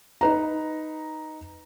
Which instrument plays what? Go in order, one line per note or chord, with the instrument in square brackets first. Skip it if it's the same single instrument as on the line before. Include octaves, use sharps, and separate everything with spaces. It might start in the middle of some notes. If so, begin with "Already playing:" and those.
[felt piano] D#4 B4 A#5